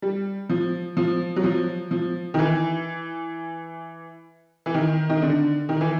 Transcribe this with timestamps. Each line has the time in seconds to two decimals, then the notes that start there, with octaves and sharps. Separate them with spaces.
0.02 G3
0.50 F3
0.97 F3
1.36 F#3
1.44 F3
1.91 F3
2.34 D#3
2.39 E3
4.66 E3
4.74 D#3
5.09 D#3
5.22 D3
5.69 D#3
5.81 E3